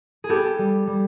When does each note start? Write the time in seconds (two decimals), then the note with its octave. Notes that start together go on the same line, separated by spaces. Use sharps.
0.24 G#4
0.29 B3 G4 A4
0.59 G3
0.87 G3